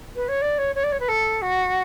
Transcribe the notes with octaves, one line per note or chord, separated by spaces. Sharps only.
B4
C#5
D5
C#5
C#5
D5
C#5
B4
A4
F#4